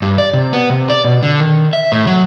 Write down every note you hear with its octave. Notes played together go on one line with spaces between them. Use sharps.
G2
D5
C3
B3
C3
D5
B2
D3
D#3
E5
A2
F#3